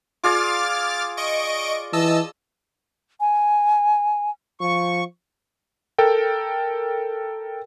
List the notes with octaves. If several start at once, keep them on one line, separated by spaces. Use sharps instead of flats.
F4 G#4 D5 D6 F6 A6
D#5 C#6 D7
E3 D#5 A5 E6
G#5
F3 C#6
A4 A#4 G5